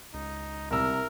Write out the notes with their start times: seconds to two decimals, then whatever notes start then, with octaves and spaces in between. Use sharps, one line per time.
0.14 C#2 D#4
0.71 C2 A#4 E6